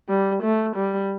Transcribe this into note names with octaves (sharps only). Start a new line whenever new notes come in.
G3
A3
G3